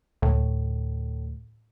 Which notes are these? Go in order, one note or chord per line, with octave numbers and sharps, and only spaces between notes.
D2 A2